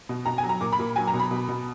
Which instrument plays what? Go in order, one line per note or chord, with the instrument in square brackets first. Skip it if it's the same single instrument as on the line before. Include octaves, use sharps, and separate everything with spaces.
[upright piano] B2
B2 A#5
G#5
F#3
A#5
A#2 D6
B5
A#2
F#3 G#5
A#5
B2
B5
B2
B2